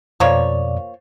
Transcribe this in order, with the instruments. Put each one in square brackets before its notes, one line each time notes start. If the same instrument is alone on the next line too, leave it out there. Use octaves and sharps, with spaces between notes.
[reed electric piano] F2 B2 D5 [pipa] F3 A#3 C#5